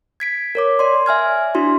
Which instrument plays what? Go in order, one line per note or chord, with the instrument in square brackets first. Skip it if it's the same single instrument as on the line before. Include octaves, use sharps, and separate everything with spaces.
[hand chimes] G#6 B6 D7
A#4 C#5 D6
D5 C6
E5 G#5 F6 G#6
D4 E4 F#4 C6